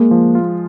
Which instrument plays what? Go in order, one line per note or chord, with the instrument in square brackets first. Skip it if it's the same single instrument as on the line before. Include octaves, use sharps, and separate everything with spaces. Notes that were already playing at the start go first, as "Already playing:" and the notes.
Already playing: [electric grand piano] G#3 [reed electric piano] A#3
[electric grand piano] F3
F4